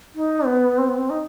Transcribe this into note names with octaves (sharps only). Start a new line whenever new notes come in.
D#4
B3
C4
B3
C4
D#4